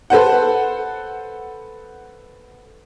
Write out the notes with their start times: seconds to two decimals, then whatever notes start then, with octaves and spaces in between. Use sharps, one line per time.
0.10 A4 B4 C5 F#5